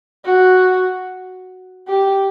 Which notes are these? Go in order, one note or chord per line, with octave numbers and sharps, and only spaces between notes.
F#4
G4